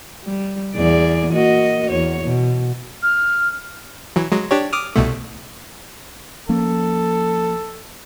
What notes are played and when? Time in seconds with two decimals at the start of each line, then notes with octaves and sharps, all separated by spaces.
0.25 G3
0.75 E2 G#4 D5
1.33 A#3 F#4 D#5
1.91 E2 C#5
2.25 B2
3.03 F6
4.16 E3 F#3
4.32 F#3 G#3
4.51 D4 G4 C#5
4.73 D6 D#6 F6
4.96 C2 B2 A3
6.49 F3 A#3 C#4 A4